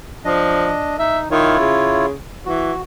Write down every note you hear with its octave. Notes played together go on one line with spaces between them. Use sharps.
F3 D4 D#5
D#4 E5
D#3 E4 F4 C#5
C#3
E3 F#4